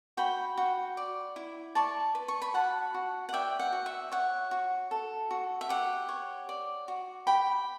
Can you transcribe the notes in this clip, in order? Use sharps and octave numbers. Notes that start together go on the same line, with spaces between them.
F#4 G5 B5
F#4
D5
E4
D5 A5 C#6
B4
C#6
B5
F#4 F#5 A5
F#4
F#5
D5 E5 G5
F#5
F#4
E5
C#5 F#5
F#4
A4
F#4
E5
G4 F#5
C#5
D5
F#4
G4 G5 B5